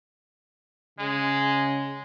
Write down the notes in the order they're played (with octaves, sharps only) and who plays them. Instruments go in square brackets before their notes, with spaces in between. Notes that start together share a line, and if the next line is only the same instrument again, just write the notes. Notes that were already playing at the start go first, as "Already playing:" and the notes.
[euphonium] C#3 [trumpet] G#3